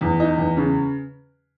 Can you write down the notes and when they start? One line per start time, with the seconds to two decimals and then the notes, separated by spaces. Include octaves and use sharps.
0.01 E2
0.20 D#4
0.37 E2
0.57 C#3